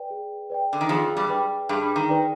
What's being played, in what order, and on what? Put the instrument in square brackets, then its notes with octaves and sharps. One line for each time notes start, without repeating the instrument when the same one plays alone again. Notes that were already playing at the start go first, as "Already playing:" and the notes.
Already playing: [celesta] B4 D5 G5
G#4
B4 D5 G5
[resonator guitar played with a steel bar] D3
D#3
[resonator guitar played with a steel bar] F2 F3 [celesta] G#4
[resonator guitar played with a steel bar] G2 G3
[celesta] B4 D5 G5
[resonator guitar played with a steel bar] G2 G3 [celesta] G#4
[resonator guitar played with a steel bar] D#3
[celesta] B4 D5 G5